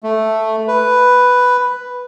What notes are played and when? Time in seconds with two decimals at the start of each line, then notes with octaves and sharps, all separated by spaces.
0.03 A3
0.68 B4